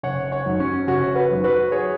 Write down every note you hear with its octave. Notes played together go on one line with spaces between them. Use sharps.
F#1 C#5 F#5
C#5 F#5
F#2 D#3 F#3
C#4 F#4
F#1 C#4 F#4
F#4 B4
F#2 D#3 F#3
F#4 B4
G#4 C#5